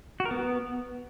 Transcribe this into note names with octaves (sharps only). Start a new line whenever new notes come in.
F#4
A#4
B3